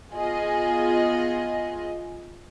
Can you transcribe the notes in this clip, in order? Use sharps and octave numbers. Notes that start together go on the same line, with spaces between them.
B3 F4 G#4 D#5